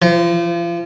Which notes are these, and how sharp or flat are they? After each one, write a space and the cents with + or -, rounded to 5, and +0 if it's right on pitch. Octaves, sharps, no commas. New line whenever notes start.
F3 -35